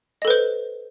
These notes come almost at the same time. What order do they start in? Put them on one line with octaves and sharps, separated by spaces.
D#5 A4 B4 C5